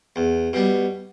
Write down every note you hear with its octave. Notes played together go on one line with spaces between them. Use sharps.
E2
B2 G3